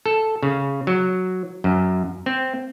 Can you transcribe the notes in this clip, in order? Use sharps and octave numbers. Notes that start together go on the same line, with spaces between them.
A4
C#3
F#3
F#2
C4